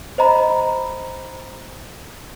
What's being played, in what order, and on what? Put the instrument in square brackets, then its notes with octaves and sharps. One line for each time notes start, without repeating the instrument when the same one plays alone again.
[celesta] C5 D#5 A#5 B5